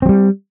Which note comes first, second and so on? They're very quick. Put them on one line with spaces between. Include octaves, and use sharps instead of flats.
C4 F#3 G3